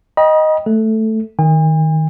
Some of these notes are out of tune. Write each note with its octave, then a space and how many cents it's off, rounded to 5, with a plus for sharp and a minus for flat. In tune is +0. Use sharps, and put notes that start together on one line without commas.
D#5 +0 G5 +0 B5 -45
A3 +0 A4 +0
D#3 +0 G#5 -45